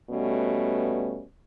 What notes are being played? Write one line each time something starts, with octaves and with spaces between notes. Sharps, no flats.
B2 G3 A3 B3 C#4